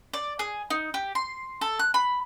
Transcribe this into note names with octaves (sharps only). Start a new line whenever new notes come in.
D5
G#4
D#4
G4
C6
A4
F#6
B5